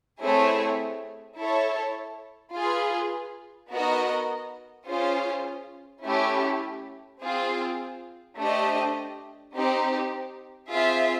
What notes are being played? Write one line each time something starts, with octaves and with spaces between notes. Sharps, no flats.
A3 C4 E4 G#4 C#5
E4 A4 C#5
F4 G#4 B4
B3 D#4 F#4 A#4 D#5
C#4 F4 G#4 C5 F5
A3 C#4 E4 G4
C4 F4 G#4
A3 D4 G4 C5 D#5
C4 D#4 G4
C4 F4 G#4 C5 E5